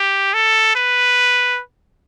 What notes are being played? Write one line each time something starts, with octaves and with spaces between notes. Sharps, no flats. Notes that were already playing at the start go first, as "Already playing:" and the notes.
Already playing: G4
A4
B4